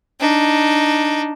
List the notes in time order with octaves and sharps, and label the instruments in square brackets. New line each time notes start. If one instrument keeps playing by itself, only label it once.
[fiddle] D4 D#4